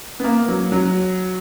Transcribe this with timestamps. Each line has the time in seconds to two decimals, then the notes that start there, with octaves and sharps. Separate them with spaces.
0.20 B3
0.24 A#3
0.49 F#3
0.72 F#3